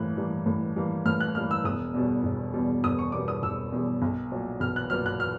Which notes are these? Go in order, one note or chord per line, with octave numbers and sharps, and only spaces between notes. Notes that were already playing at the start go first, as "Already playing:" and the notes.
Already playing: A2 E3 G3 A#3 F#6
E3 G3 A#3
A2
E3 G3 A#3
A2 F6
F#6
E3 G3 A#3 F6
E6
E1 D#6
E2 B2 G3
E1
E2 B2 G3
E1 D#6
C#6
E2 B2 G3 D6
D#6
E1 E6
E2 B2 G3
B1
A#2 F#3
B1 F6
F#6
A#2 F#3 F6
F#6
F6